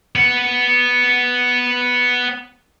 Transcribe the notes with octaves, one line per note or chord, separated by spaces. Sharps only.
B3 F#5